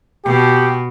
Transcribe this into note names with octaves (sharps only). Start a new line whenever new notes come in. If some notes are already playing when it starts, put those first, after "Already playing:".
B2 G4